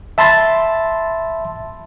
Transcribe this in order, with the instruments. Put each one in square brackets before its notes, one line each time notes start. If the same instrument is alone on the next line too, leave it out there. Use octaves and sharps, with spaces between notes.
[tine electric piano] E5 A5 B5 C6 A6